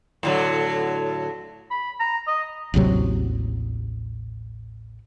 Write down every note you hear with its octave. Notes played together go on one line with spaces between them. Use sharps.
A2 D3 F#3
B5
A#5
D#5
A1 D#2 C3 F#3